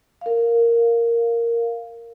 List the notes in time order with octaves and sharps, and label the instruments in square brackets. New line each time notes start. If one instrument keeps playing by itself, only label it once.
[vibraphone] A#4 F5